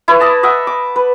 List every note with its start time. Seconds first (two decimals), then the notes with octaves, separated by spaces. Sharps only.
0.08 E4 B4 C#5
0.20 D5 D#5 A5
0.43 D#5 E5 F#5 D6
0.67 D6
0.96 B4